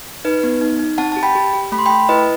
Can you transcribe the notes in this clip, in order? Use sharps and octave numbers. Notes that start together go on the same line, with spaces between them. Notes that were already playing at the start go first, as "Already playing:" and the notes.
D#4 B4
B3
D#4
D#4
C4 F#5 A5
G4 A5
G5 B5
G4
G4
A3 B5
C6
A3 G5 B5
E4 B4 D#5